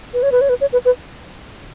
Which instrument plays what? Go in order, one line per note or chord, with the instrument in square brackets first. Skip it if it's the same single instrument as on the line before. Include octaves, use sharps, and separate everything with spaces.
[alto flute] B4
C#5
B4
C#5
B4
C#5
B4
B4